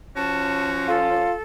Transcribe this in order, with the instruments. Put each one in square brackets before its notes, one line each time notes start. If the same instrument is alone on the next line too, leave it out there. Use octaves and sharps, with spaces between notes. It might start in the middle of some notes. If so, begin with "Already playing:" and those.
[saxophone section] F3 C#4 [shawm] F#4 [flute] A5
[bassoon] F4 [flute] A4